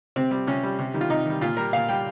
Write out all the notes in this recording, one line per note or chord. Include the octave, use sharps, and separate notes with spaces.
C3 C4
G3
C3 C#4
G3
C3
D#3 G3
F4
C3 D#4
D#3 G3
A#2 F4
G3 A#4
A#2 F5
G3 G5